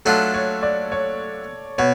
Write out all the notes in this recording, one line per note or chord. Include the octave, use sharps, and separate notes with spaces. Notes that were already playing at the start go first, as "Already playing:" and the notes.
F#3 A3 D4 F4 A4
C#5
D5
C#5
B2 C#5